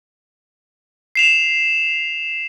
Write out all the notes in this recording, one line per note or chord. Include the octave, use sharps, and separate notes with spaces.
C7 E7 F7